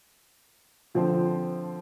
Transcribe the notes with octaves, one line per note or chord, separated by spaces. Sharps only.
D3 F3 C4